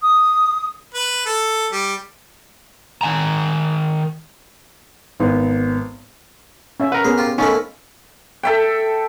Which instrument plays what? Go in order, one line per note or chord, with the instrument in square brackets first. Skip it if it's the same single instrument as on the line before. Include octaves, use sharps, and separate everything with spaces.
[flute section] D#6
[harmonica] B4
A4
G3
[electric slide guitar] D#3 G#5 A#5
[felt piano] G#1 B3
[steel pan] C#4 E5
[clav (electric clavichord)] A#4 B4 [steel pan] F#5
[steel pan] B3 C#4 G#4 [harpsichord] C5
[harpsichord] F4 G4
[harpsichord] F3 A3 A#4 [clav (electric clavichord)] C#4 [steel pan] D#4 B5
[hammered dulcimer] A4 E5 G5